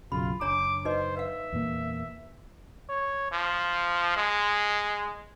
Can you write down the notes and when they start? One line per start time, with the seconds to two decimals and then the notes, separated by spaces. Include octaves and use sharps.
0.12 B1 F#2 C#3 F4 B5
0.41 F#1 D4 C#5 A#5 D6
0.85 D#4 B4 C5 D#5
1.17 B4 E5 F5
1.53 E2 A#2 A#3
2.89 C#5
3.32 F3
4.17 G#3